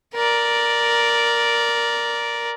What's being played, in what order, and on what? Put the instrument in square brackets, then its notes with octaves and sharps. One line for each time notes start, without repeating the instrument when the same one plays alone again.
[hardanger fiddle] A#4 D5